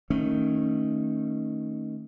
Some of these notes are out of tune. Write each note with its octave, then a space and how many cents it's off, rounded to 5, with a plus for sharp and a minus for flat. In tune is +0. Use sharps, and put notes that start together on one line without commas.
D#3 +0 A3 +15 C#4 -20